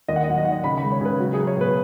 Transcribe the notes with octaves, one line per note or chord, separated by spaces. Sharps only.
D#2 D#5
F#5
D#5
F#3 F#5
D#5
D#3 F#5
D#5
C#3 B5
B5
G#3
C#5
C#3 B4
F#3 F#4
G#4
F#3
C#5
B2 B4